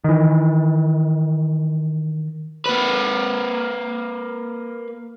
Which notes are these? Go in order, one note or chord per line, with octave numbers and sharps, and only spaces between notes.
D#3 E3
A#3 B4